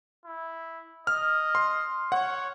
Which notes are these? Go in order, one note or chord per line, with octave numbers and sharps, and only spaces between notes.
E4
D#5 F6
C6
C#5 F#5